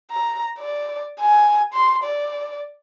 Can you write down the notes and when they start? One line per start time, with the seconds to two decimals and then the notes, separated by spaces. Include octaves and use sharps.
0.11 A#5
0.59 D5
1.20 G#5
1.73 C6
2.03 D5